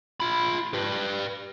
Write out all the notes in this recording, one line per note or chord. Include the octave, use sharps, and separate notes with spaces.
F4 B5
G4 B4